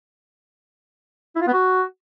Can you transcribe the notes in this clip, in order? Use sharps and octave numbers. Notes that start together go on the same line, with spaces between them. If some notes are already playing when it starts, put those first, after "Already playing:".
E4
F4
B3
F#4